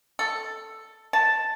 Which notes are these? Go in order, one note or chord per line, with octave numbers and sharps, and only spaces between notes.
A4
A5